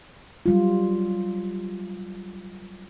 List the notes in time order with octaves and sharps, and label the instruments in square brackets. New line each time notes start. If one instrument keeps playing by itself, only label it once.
[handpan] F#3 G3 F4